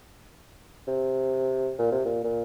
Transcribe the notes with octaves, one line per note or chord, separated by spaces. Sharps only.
C3
A#2
C3
A#2
A#2